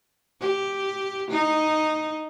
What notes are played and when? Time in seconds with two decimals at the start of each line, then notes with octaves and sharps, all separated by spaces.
0.40 G4
1.30 D#4